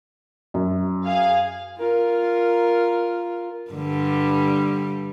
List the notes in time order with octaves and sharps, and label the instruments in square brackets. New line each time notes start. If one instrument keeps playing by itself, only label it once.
[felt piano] F#2
[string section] G#4 F5
[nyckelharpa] F4 A#4
[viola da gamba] G2 D3 G3